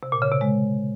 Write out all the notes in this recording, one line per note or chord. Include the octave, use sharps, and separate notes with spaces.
C3
A#2
C#3
C3
G#3